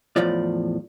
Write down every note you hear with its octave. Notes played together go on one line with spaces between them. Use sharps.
E2 A2 F3 F4 D5